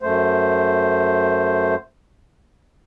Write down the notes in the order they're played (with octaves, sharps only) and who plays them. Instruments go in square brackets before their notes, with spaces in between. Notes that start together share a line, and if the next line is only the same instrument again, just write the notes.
[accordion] F#2 A3 C5